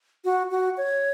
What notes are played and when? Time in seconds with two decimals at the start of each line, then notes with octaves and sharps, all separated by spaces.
0.25 F#4
0.51 F#4
0.77 C#5